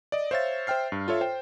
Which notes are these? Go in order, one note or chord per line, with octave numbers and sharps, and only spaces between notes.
D5 D#5
C5 C#5 E5 F5 A6
C5 E5 G5 F6 C7
G2
F4 A4 C#5 E5
C5 G5